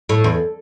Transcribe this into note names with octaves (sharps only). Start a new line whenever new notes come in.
A2
E2